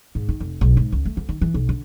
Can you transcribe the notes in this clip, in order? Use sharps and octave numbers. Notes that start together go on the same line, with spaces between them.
G#2
D#3
F1
B1
G#2
C#2
A3
D2
D#3
E3
B1
D3